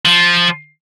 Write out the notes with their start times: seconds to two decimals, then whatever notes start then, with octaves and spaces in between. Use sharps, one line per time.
0.05 F3